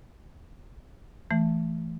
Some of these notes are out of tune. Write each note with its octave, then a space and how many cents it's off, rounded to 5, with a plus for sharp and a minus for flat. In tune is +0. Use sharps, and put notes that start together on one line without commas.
E3 +15 A3 +0